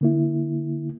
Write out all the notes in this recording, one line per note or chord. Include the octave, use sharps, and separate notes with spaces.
D3 A#3 E4